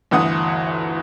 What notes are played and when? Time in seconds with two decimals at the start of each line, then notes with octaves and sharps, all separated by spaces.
0.11 G1 D2 E3 F#5 D#6